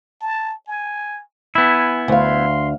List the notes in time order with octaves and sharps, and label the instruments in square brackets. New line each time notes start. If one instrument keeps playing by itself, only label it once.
[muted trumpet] A5
G#5
[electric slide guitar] B3 E4 [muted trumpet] G#5
[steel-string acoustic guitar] D2 F5 [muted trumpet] C6